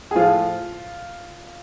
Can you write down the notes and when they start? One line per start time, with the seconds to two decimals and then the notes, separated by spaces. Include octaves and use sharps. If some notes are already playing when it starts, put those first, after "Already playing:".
0.11 G#4
0.15 A2 F3 F4